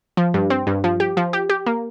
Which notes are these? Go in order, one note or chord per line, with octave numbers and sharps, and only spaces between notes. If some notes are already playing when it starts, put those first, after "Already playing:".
F3
G2
C4
G2
F3
G4
F3
G4
G4
A#3